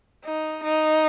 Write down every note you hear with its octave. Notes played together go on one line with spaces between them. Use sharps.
D#4
D#4